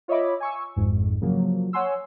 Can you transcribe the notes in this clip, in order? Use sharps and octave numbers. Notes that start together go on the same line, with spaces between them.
F4 C#5 D#5 E5 B5 D6
G#5 C#6 E6
G#1 F2 G#2
C#3 F3 F#3 A#3
C#5 F#5 G#5 C6 E6